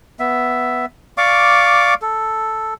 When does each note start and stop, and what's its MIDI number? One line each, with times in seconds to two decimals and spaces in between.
0.19 0.85 59
0.19 0.85 76
1.18 1.94 74
1.18 1.94 77
1.18 1.94 85
1.18 1.94 86
2.02 2.74 69